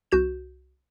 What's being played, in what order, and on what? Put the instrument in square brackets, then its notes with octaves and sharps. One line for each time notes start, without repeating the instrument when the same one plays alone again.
[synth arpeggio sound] C2 F#4 G6 E7